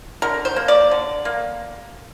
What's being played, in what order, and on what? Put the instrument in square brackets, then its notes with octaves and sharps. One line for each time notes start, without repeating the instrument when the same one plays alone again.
[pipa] D3 A#4
C5
A#3
D5
D3
A#3